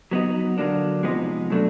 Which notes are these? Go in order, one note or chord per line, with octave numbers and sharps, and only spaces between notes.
F#3 B3 D#4
D3 F#3 A#3 D4
C3 F3 G#3 B3 D#4
B2 F#3 A3 D4